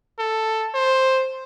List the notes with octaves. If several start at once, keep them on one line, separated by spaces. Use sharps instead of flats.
A4
C5